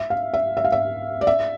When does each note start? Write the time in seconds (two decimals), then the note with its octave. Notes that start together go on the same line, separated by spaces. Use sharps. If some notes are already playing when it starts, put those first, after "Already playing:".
Already playing: E5
0.10 F5
0.34 E5
0.57 E5
0.65 F5
0.72 E5
1.21 D5
1.27 E5